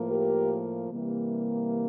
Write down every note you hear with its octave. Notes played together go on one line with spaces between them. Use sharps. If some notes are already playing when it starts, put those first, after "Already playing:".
Already playing: A2 F3 A#3
G4 A#4
C3 E3 G3 A#3